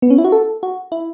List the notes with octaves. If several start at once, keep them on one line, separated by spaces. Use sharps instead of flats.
B3
C#4
E4
F#4
A4
F#4
E4